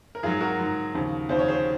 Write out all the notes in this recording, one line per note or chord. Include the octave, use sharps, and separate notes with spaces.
A#4
G#2 F#3 F4 G#4
F#4 A#4
G#2 F#3
D#2 C#3 F3
D#2 C#3 F3 C5
C#5
G#4 C5